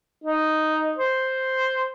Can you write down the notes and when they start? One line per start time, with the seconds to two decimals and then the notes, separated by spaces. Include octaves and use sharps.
0.24 D#4
0.97 C5